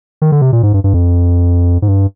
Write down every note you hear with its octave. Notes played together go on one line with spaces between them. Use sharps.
D#3
D3
C3
A#2
G#2
G2
G2
F2
G#2
G2